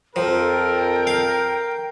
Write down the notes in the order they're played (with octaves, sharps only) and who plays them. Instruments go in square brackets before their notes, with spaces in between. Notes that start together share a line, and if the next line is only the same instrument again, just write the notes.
[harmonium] F2 A4 [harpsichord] F3 [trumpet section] A#4 [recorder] G5
[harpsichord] F5